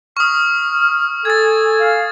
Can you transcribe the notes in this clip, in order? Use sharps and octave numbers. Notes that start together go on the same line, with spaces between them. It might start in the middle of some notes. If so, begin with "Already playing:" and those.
C#6 D#6 F6
A4 G#5 G#6 A6
F5